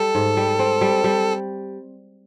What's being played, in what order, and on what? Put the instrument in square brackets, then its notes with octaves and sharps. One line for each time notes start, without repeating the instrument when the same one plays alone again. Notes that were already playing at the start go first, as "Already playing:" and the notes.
Already playing: [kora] G3 [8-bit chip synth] A4
[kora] G#2
G3
C4
G3
G3